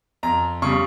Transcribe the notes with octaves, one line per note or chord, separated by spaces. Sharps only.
F2 A#5
C#3 G3 C#6